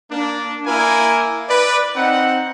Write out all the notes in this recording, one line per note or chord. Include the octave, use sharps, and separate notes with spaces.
A#3 D4
A#3 E4 A#4 G#5
B4 D5
C4 D#4 F#5